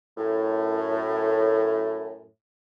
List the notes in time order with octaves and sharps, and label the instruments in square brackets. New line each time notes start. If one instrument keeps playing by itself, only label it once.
[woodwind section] F#2 A2